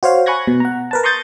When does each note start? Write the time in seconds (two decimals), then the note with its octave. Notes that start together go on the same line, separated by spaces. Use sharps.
0.03 F#4 C5 C#5 F5
0.26 G#5 B5 C#6 F#6 G#6 A#6
0.47 B2
0.60 F#5 A#5
0.91 A#4 B4 A5
1.03 A#5 C6 C#6 D#6 G6 A6